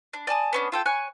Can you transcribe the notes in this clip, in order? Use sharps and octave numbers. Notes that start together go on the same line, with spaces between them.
D4
D5 G#5 A5 D#6
B3 C#4 D4
F4 A4 G5
C#5 G#5 F#6